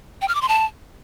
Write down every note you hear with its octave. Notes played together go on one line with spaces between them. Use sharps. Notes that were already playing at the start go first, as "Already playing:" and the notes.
G5
F6
D6
C6
A5